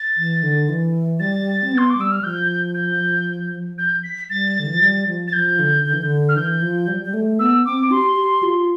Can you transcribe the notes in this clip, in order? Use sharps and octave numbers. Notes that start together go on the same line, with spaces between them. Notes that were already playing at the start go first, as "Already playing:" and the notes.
Already playing: A6
E3
D3
E3
G3 A6
C4
B3
C6
D6
G3 E6
F6
F3 G6
G6
G6
B6
G3 A6
D3
E3
F3
G3
F3
A6
F3 G6
D3
D3
E3
D3
F6
E3 G6
F3
G3
G3
A3
B3 E6
C4 D6
G4 C6
G4
F4